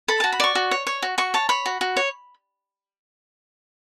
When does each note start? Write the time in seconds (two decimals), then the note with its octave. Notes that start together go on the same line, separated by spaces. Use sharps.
0.08 A4 B5
0.20 F#4 A5
0.32 B5
0.40 D5 C#6
0.55 F#4
0.71 C#5
0.87 C#5
1.02 F#4
1.18 F#4 C#6
1.34 C#5 A5
1.49 C#5 B5
1.66 F#4
1.81 F#4
1.97 C#5